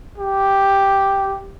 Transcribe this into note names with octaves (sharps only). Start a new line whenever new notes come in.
G4